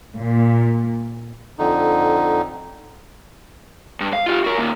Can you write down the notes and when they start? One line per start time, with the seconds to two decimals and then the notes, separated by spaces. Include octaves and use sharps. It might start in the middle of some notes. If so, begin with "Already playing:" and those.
0.17 A#2
1.59 F2 D3 D#4
4.00 G2
4.13 F5
4.26 F4 G4
4.44 F#4 A#4
4.57 D#2 A#2